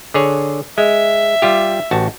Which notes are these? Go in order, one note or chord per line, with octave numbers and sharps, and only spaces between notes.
D3 G#4 C#5
G#3 E5
G3 F4 G4
A1 F#4 A5